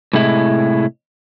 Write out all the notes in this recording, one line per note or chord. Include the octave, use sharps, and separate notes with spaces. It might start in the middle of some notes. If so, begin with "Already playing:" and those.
A2 C3 G#3 E4